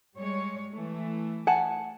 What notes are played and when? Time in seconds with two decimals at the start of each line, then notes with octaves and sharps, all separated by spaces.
0.17 G3 G#3 C#5
0.72 E3 A3
1.47 F#5 G#5 A5